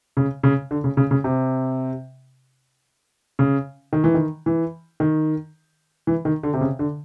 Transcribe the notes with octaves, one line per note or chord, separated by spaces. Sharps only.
C#3
C#3
D3
C#3
C#3
C#3
C3
C#3
D#3
E3
D#3
E3
D#3
E3
D#3
D3
C3
C#3
D3